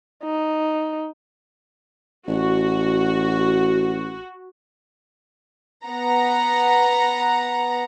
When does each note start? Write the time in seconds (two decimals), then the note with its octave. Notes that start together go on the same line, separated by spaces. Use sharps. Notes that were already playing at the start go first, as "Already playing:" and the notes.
0.24 D#4
2.27 A1 F#4
5.85 B3 F#5 A#5